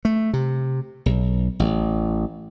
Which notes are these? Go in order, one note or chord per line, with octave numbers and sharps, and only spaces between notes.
A3
C3
B1
A1